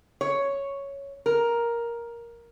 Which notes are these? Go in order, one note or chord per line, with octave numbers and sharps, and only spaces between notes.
C#5
A#4